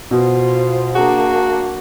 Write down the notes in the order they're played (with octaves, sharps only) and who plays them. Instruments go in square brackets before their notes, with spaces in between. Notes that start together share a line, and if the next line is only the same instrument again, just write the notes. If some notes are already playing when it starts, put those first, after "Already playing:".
[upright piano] B2 [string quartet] F4 C5
[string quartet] A#3 D4 [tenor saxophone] F#4 [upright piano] G#4 A#5